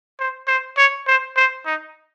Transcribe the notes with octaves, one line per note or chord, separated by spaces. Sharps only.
C5
C5
C#5
C5
C5
D#4